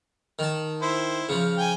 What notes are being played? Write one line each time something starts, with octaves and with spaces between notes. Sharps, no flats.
D#3 A5
E4 C5
C#3 F3
G5 G#5